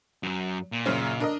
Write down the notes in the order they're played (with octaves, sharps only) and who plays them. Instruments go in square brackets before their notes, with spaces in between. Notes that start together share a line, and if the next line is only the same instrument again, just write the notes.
[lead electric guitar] F#2 F#3
A#2
[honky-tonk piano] F#2 C#3 C#4
D4 A#4 D#5